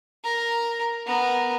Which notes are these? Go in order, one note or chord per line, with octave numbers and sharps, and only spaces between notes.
A#4
B3 A#4